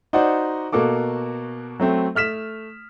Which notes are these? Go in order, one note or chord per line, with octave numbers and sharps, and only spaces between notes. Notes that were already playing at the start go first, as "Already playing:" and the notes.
D#4 F#4 C5 D5 F#5
B2 A#3 F#4 A4 D6
F#3 A3 C4
A3 F6 B6 E7